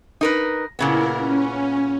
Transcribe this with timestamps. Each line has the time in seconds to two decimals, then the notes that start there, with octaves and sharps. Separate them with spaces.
0.21 D#4 A#4 B4
0.79 A#2 C#3 B3 E4 A#4
1.14 C#4